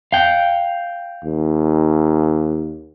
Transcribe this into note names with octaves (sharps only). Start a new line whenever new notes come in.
F5 G5
D#2